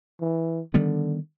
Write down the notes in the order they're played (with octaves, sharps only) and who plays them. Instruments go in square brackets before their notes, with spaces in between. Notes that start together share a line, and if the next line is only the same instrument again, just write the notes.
[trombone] E3
[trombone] D3 [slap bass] D#3 G3 B3